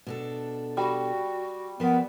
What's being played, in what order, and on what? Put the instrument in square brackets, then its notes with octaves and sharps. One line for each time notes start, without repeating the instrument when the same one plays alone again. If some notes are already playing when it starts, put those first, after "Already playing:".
[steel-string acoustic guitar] B2 D4 A4
[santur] G3 [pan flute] F#4
[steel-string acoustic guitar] F3 B4 [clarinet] B3 [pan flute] A#4